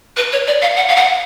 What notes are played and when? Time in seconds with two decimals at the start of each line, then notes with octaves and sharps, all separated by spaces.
0.17 B4
0.32 C#5
0.47 D5
0.62 F5
0.76 F#5
0.88 F5
0.96 F#5